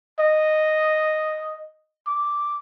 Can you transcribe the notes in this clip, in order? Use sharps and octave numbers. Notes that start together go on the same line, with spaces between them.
D#5
D6